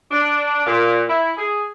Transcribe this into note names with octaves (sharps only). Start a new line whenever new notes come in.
D4
A#2
E4
G#4